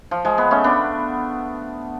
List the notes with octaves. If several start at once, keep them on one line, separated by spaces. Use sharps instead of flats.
F3
F3 G#3
G#3 B3
A3 C#4
B3 D4